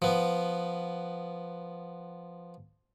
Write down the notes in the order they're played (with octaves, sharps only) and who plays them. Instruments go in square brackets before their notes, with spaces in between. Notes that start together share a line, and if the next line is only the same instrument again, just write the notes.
[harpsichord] F3 B3